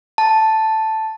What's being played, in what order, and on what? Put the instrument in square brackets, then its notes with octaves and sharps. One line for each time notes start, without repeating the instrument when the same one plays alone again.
[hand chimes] A5